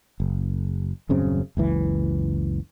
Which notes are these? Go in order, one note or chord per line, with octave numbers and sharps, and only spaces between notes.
F#1
D#1 F#2 C#3 C4
F#1 C#2 E3